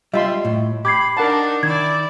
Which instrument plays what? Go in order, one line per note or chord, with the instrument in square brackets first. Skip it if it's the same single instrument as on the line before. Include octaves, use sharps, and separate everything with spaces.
[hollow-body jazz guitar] G3 F4 [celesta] D#5 [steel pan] E5 C6
[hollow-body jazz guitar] A2
[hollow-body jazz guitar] G4 [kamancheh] B5 [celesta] D6 G#6 C7
[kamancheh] D4 D#4 [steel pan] A#4 F#5 A5
[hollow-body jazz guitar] D#3 [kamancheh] E4 D5 [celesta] G#6